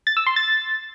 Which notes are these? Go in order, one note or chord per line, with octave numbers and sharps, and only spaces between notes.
A6
E6
C6
A6